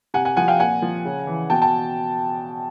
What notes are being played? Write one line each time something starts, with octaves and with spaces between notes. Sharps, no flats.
C3 F#5 G#5
F#5 G#5
F3 F#5 G#5
F5 G5
A#2 F#5 G#5
F3
C#3
E3
B2 G5 A5
G5 A5